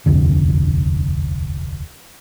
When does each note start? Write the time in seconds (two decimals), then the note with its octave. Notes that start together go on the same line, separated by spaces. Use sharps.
0.06 D#1 C2 F2 D3